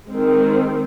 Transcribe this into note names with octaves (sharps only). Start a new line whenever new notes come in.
D#3 G#3 C4